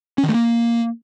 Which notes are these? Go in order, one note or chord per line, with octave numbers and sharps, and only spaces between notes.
C#4
D#3
A3
A#3